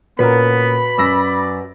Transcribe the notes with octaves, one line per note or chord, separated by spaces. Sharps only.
A#2 B3 C#4 F#4 A#4 B4 B5
F#2 D5 E6 A#6